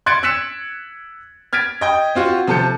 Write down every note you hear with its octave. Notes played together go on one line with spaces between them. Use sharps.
C6 F#6 G#6 A6 C#7 D7
E6 F#6 A6 B6 C#7 E7
F6 G#6 A6 B6 D7
D#5 G5
C4 F4 F#4
C3 F3 A4 A5 G6 C#7